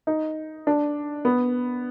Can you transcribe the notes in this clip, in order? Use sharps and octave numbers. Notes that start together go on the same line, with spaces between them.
D#4
D4
B3